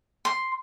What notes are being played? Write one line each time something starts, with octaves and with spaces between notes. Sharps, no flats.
C6